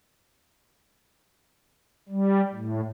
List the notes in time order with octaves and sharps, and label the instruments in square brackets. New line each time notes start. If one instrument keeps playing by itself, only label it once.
[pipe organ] G3
A2